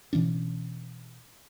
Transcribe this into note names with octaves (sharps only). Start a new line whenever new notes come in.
B2 E3 C#4 D4